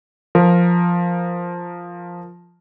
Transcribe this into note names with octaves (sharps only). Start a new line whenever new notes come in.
F3 A#4